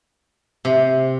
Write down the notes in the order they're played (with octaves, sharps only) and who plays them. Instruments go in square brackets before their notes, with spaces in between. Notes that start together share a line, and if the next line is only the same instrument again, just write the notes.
[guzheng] C3